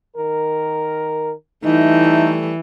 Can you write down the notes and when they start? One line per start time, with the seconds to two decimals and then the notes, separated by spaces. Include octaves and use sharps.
0.16 D#3 A#4
1.64 E3 G3 A3 D#4